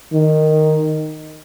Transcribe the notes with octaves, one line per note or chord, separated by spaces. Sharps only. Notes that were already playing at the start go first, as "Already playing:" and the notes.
D#3